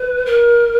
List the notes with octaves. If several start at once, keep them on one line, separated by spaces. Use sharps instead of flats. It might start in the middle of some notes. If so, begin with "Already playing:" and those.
Already playing: B4
A#4